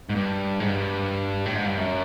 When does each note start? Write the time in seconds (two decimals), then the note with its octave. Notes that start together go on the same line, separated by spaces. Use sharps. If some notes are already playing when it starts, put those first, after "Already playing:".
0.10 G#2
0.15 G2
0.60 G#2
0.69 G2
1.46 A2
1.55 G#2
1.66 G2
1.77 F#2